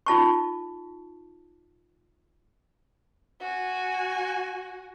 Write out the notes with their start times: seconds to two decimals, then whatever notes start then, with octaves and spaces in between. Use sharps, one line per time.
0.06 D#4 F4 A5 C#6
3.40 F#4 G#5